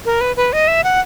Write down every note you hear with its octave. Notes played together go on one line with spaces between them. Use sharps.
A#4
B4
B4
D#5
E5
F#5